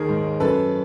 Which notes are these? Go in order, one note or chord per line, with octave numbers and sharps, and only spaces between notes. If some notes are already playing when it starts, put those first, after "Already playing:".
Already playing: D#2 D#3 G#4 A#4
G#2
F#2 A4 B4